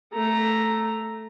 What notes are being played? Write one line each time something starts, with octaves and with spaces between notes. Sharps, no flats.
A3 A#5